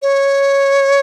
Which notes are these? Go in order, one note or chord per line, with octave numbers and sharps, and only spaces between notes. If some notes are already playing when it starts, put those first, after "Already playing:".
C#5